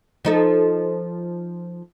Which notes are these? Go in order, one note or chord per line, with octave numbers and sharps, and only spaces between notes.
F3 D#4 A4